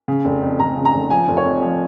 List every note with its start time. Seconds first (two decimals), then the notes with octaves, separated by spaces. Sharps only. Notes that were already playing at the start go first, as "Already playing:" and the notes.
0.08 C#3
0.25 F1
0.42 F2
0.59 F1 A#5
0.77 C#3
0.85 A#5
0.94 F1
1.10 F3 G#5
1.28 F1
1.37 C#5
1.45 F2
1.62 F3